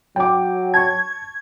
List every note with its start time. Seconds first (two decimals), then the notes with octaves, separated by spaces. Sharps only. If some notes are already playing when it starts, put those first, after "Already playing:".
0.16 F#3 G5 D6
0.74 A5 C#6 G#6